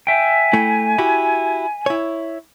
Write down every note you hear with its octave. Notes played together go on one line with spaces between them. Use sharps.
E5 G5 G#5
A3 E4
E4 F#4 G4
E4 C#5